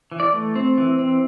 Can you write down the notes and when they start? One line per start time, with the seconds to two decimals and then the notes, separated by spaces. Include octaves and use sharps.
0.12 E3
0.20 D5
0.33 A3
0.56 C4
0.78 E3
0.99 C4